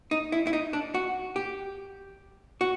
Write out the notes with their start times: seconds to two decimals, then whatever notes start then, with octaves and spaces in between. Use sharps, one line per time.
0.11 D#4
0.32 E4
0.47 E4
0.53 D#4
0.73 D4
0.94 F#4
1.36 G4
2.61 F#4